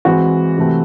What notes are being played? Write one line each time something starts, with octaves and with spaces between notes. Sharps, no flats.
E3 G#3 C4 F#4
C3 E3 A3 C4